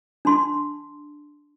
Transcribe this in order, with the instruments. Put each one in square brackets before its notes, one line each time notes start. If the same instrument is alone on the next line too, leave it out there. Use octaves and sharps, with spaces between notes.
[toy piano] D4 A5 C6